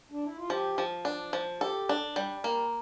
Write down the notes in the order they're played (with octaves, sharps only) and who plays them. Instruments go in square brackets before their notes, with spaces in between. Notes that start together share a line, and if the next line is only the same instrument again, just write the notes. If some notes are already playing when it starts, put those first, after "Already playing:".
[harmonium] D4
E4
F4
[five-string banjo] F3 [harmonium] G4
[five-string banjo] F3
D4
F3
[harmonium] G4 [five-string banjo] A4
[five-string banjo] D4
G3
A#3